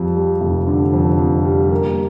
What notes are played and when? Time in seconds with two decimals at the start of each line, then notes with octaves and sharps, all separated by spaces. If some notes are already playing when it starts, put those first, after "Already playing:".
Already playing: F2 G3
0.16 G3
0.41 F1
0.67 D3
0.93 F2
1.19 F2
1.45 G3
1.71 A#3